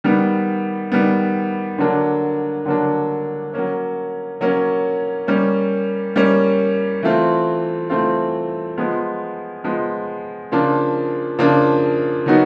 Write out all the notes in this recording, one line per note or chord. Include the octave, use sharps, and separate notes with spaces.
D#3 G3 B3
D#3 G3 B3
D3 F#3 A#3 D4
D3 F#3 A#3 D4
F#3 A#3 C#4
F#3 A#3 C#4
G3 A#3 C#4
G3 A#3 C#4
E3 A3 C4 F4
E3 A3 C4 F4
F3 G#3 B3
F3 G#3 B3
C#3 F3 A#3 D4 F4
C#3 F3 A#3 D4 F4
D#3 F#3 B3 D#4 F#4